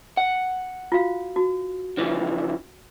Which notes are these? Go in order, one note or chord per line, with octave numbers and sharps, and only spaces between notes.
F#5
F4 F#4 F5
F#4
C#3 E3 F3